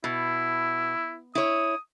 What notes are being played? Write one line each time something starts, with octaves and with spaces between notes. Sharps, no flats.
B2 E4
E4 C#5 D#6